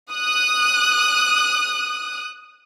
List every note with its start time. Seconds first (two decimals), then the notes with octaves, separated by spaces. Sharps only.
0.11 D#6 F#6